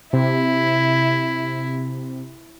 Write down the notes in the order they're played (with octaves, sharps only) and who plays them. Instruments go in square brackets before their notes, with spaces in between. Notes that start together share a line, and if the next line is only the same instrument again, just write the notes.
[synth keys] C3 [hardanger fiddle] E4